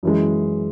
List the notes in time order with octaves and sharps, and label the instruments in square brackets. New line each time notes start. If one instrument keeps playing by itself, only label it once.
[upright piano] F#2 E3 G#3